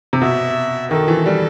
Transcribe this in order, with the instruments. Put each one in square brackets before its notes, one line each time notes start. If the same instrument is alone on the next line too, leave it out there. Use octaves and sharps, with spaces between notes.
[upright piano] C3
[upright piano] B2 [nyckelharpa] E5
[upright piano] D#3 [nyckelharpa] A4
[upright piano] E3
G3